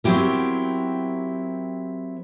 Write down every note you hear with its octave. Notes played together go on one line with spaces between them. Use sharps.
F#3 C4 E4 G4 A#4